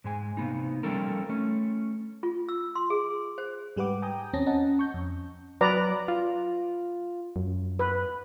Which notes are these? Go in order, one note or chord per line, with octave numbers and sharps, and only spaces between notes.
G#2 G#3 G#5
C3 A#3 B3 D#4
F3 G3 C#4 A4 A#4
A3 C#4
F4
E6
C6
G#4
C5
G#2 G3 G4 B4 F#5 D6
G5 G#5 A#5 D#6 G6
D#2 C4 C#4 A5 A#6
C#4 D#5 F#5 A5 A#5
C#6 G6
F2
F#3 B4 D5 A#5
F4
F#2
B4